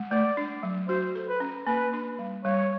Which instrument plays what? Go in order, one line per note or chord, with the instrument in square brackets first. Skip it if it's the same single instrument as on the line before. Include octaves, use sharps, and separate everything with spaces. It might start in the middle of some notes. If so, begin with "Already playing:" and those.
Already playing: [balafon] G#3
[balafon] A3 [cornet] D5
[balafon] D4
F#3
[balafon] F#4 [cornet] C5
[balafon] A4
[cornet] B4
[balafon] C#4
[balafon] A#3 [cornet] B4
[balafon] D4
G3
[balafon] G3 [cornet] C#5